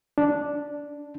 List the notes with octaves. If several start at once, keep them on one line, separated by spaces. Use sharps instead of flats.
D4